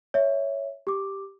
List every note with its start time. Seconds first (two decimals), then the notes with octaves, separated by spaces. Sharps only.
0.14 C#5 E5
0.87 G4 D6